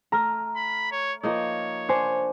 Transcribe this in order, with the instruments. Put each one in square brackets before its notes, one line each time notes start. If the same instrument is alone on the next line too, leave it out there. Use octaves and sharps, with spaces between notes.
[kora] A3 [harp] A#5 F6
[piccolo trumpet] B5
C#5
[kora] F3 A#3 D#4 [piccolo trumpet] C#5
[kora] D4 [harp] C5 G#5 C#7